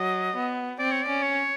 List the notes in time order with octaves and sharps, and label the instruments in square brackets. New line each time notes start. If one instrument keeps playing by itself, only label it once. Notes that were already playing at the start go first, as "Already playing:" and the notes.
Already playing: [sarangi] F#3 [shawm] D#5
[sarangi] B3
[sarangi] C4 [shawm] D5
[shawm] C#5
[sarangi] C#4 [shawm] D5
[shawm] C#5